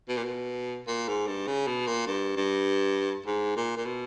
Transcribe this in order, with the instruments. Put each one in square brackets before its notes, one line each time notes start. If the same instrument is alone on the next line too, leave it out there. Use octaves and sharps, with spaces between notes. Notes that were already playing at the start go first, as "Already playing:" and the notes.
[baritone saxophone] B2
A#2
B2
A#2
G#2
G2
C#3
B2
A#2
G2
G2
G#2
A#2
A#2
B2